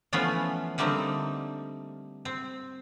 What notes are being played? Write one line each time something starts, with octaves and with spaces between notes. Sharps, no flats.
E3 F3 A3 B3 C#4 F4
D3 G3 A3 A#3 C4 D#4
C4